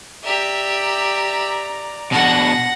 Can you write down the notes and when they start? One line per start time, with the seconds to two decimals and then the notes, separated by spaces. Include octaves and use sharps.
0.24 G4 D5 E5 A#5
2.12 B2 D4 F#5 A#6